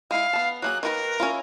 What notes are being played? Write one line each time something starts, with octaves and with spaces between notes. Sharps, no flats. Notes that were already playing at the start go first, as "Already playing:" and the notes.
G#3 E4 F5
B3 A5
F#3 A#3 G#4 F#6
D#3 F4 A#4 B4
C#4 E4 F4